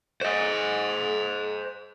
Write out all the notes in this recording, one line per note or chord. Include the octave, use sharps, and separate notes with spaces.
C5 D#5